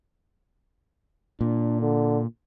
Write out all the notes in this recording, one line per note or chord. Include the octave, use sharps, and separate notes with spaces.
A#2 D4
D3